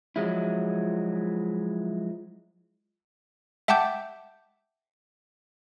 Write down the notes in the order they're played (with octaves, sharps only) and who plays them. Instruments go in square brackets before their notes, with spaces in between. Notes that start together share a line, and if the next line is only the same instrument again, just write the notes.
[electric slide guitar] F3 F#3 G#3 E4
[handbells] E5 F#5 G5 A5 D6 G6